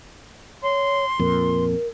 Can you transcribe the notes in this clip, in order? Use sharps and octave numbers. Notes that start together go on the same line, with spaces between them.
C#5 C6
F2 A#2 A#4